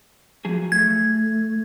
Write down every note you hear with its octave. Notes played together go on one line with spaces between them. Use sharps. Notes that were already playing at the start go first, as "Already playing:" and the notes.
F3 F#3 G#4
A3 G#6